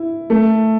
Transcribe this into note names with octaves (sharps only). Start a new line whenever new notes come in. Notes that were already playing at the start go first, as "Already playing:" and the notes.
Already playing: E4
A3